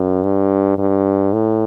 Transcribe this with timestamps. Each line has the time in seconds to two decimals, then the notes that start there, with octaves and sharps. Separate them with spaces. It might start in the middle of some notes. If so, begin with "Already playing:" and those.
Already playing: F#2
0.23 G2
0.78 G2
1.33 A2